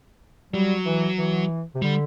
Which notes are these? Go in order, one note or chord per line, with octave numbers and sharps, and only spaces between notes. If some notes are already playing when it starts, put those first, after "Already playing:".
F#3 G3
E3
E3
C3
D3 G3